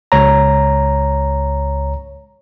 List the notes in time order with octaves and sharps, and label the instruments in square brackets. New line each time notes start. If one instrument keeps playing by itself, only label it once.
[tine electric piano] C#2 C#5 A#5